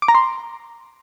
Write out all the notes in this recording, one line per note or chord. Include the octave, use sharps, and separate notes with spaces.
D6
A#5
C6